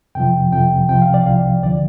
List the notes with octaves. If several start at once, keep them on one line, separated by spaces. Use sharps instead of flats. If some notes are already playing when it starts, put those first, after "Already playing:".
F2 C3 F3 G5
F2 C3 F3 G5
C2 C3 F3 G5
F5
D5
C2 C3 F3 F5
D2 D3 F3 D5